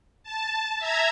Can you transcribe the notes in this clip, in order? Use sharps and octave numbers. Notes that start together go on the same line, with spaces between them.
A5
E5 A#5 G#6